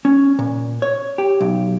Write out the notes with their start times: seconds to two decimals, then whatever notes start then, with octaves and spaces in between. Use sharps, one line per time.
0.05 C#4
0.39 A#2
0.82 C#5
1.18 G4
1.41 B1